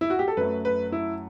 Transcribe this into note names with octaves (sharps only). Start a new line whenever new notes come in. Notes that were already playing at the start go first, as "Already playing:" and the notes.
E4
F#4
G4
A4
F#2 F#3 A3 B4
B4
E4